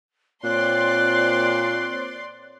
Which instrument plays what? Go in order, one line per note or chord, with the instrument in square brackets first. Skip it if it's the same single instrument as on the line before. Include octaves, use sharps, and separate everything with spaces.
[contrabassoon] A#2 [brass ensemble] C4 C#5 [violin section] D5 C6 [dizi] F#6